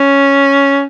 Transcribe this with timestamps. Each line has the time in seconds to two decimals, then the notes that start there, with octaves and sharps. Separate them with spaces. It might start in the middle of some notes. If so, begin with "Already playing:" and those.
Already playing: C#4